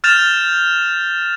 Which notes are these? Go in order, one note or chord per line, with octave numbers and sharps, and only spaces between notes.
F6 G6 A6 E7 F7